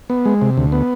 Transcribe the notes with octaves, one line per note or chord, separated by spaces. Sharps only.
B3
G#3
C3
D2
B3